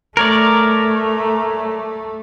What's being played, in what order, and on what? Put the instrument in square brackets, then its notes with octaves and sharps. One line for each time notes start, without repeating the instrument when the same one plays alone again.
[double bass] A3 [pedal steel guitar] A#4 C#5 D5